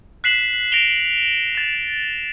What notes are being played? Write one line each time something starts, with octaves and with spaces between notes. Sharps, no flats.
F#6 B6 C7 E7 F#7
A#6 D7 E7 F7 G7
A6 E7